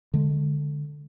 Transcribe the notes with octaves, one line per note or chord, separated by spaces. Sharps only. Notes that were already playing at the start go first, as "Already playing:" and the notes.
D3 G#3